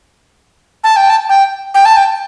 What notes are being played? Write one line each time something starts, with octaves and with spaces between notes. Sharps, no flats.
A5
G5
A5
G5
G5
A5
G5